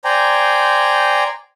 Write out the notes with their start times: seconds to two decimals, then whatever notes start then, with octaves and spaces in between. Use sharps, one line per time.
0.04 C5 D5 G5 G#5 A#5